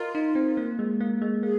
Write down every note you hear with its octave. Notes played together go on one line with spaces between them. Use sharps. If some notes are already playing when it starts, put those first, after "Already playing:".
Already playing: F4 A#4 D#5
D#4
C4
A#3
G#3
A#3
G#3
A#3 G#4